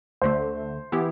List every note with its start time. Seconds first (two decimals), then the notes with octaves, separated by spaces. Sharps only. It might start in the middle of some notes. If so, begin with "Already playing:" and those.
0.22 D2 D3 A3 C5
0.92 E3 B3 E4 G4